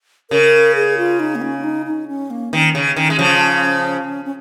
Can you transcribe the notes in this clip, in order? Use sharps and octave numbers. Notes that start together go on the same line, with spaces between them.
C#3 A#4
G#4
F4
D#4
A#3
C#4
D#4
D#4
C#4
A#3
D#3 C#4
C#3
D#3
G#3
C#3 F3
C#4